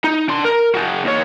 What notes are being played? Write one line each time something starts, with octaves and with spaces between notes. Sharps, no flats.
D#4
D4 C6
A#4
F#4 G#4
D#2 C#5